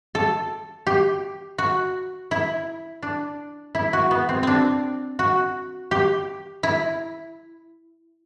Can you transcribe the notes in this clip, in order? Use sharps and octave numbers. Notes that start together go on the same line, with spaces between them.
A4
G4
F#4
E4
D4
E4
F#4
B3
C4
C4 D4
F#4
G4
E4